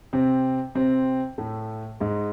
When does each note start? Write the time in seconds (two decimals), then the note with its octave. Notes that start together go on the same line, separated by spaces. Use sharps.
0.13 C3 C4
0.75 C3 C4
1.38 A2 A3
2.00 G#2 G#3